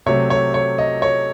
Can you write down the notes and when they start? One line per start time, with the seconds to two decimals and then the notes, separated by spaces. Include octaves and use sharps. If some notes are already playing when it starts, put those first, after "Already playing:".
0.06 C3 F#3 A3 C#5
0.30 C#5
0.54 C#5
0.78 D#5
1.02 C#5